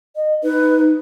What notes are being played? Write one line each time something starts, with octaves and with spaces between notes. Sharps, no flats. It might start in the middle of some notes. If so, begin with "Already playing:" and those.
D#5
D#4 B4